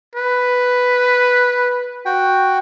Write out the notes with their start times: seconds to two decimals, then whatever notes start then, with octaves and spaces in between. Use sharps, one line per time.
0.15 B4
2.05 F#4 G5